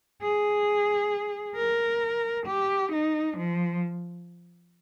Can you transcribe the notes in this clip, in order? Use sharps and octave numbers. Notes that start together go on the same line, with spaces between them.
G#4
A#4
G4
D#4
F3